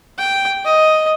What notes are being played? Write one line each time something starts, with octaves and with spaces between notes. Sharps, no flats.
G5
D#5